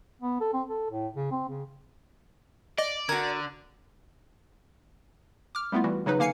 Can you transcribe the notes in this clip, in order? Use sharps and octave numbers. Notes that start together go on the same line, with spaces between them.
B3
A4
C4
A4
A2
C#3
C4
C#3
D5 D#5
D3 F#4 A#4 G#6
D6 F6
G3 A3 B3 E4 F4
E3 G3 F#4
C#3 F#3 D#4 B4
D3 A#3 F5 G#5 C7 C#7